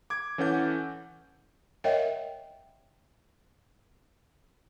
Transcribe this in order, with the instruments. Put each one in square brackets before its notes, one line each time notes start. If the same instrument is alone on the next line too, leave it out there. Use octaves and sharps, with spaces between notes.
[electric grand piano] D6 G#6
E3 C#4 A4 F#5 G6
[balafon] A#4 C#5 D#5 E5 F#5 G5